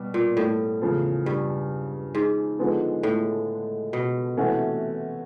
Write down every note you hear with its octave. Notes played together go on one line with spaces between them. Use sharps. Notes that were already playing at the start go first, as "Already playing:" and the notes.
Already playing: B2 G3
A#2
A2
E2 C#3 F3
G2
G#2
D3 F3 G#3 B3
A2
B2
C3 E3 A3 C#4 F#4